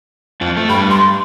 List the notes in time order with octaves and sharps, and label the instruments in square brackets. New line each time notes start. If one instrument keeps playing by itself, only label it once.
[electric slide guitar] F2 F3
A3
[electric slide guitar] G2 G3 [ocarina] B5
[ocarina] C6